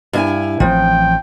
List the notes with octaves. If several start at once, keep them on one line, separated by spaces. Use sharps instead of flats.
G2 E4 G#5
A1 E3 F3 C4 G5